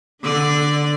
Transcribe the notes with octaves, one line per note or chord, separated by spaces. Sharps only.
D3 D4 D5